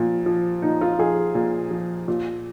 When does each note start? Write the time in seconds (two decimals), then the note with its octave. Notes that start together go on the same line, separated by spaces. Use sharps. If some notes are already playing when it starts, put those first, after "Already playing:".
Already playing: A#2 F3
0.26 F3
0.62 A#2 D#4
0.81 F4
0.98 F3 G#4
1.35 A#2
1.71 F3
2.08 A#2